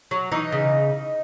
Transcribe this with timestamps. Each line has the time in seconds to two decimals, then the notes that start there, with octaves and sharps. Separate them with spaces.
0.11 F#3
0.32 E3 D#4
0.52 C#3